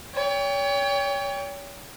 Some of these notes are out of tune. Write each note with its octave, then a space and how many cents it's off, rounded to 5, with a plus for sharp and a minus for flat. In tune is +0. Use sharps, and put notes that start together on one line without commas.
C#5 +35 G5 +25